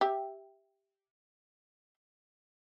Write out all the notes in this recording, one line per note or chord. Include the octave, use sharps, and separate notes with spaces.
G4 E5